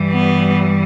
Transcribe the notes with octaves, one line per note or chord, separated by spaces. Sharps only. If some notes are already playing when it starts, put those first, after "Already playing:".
Already playing: G2 E3 G3
B3